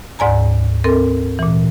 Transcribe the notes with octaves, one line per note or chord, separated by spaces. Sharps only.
D2 G#2 D5 G#5 A#5
C4 A4 A#4
A#2 E3